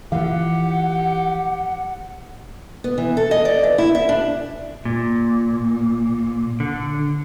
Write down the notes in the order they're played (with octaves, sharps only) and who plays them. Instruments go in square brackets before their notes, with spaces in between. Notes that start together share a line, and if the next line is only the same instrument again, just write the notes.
[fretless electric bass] E3 F3 [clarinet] G4 [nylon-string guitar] F5 [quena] F#5
[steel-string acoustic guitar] B3
E3
A4
D#5
D5
E3
E4
E5
D4
[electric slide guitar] A#2
D3